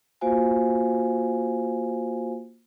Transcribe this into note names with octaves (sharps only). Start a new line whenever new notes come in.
A#3 F4 F#4 C5 F5 G#5